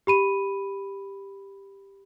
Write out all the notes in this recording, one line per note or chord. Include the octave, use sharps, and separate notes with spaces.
G4 B5 D#7